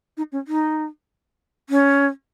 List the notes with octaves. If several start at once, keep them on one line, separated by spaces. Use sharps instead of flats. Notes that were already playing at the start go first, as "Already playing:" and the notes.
D#4
C#4
D#4
C#4